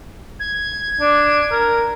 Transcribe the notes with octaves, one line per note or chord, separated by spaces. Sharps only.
G#6
D4
A#4